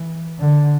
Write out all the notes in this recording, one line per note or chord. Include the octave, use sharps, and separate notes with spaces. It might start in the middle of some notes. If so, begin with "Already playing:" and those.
Already playing: E3
D3